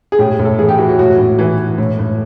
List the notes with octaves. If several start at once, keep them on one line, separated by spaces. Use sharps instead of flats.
G#4
A2 G4
A2
A4
E3 G#4
G4
E3 F#4
F#4
A2 F#4
A2
E3
E3
A2
A2